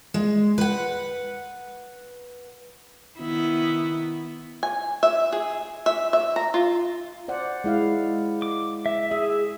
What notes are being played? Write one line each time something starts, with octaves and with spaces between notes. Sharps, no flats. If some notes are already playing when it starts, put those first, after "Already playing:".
G#3
B4 F#5
D#3 B3 E4
G#5
E5
G#4
E5
E5
A#5
F4
C5 D5 F#5
G#3 E4 F5
D6
E5
G#4 E5